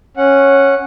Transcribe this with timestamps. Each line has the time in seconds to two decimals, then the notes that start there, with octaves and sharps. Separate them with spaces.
0.17 C#4 F#5